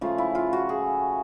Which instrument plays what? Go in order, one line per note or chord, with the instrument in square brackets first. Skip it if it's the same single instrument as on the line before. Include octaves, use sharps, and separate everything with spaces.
[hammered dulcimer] C#3 F3 A3 F4
E4
F4
F#4
G#4